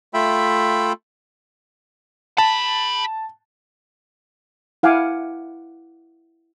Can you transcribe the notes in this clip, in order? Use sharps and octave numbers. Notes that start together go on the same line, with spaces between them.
A3 F4 E5 G5 B5
G#4 A5 B5
E4 F5 F#5 G#5 D6